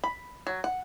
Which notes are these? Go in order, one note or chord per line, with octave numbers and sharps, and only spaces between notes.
B5
F#3
F#5